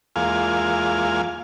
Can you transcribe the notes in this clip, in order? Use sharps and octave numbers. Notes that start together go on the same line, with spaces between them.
E2 G#3 A#3 F4 F5 G#5